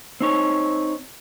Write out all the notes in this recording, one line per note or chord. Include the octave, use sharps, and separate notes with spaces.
C4 D#4 C#5